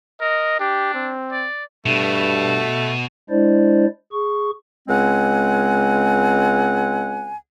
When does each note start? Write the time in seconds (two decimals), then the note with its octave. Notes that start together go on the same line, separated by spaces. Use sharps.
0.21 A#4 D#5
0.60 D4 G4
0.95 C4
1.32 D5
1.86 G2 B2 A3
3.30 G#3 D4 E4 C5 D5
4.12 G#4 C#6
4.88 C#2 G#3 C4 F#5 G#5